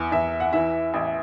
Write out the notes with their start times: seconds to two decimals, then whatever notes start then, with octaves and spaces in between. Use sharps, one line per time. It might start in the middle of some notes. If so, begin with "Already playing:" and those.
Already playing: E2
0.12 E2 E5
0.40 F#5
0.53 E3 E5
0.94 A1